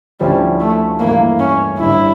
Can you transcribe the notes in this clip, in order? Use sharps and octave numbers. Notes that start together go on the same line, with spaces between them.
D2 D3 F3 G3 C#4 E4
A3
G2 E3 A3 A#3 E4
C#4
G1 G2 D3 G3 E4